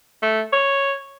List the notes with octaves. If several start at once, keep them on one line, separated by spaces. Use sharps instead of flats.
A3
C#5